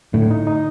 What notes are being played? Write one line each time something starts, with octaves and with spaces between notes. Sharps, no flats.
A2 D3
D#4
D#4